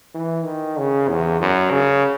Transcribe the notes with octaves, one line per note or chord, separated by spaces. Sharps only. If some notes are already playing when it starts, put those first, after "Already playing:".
E3
D#3
C#3
E2
F#2
C#3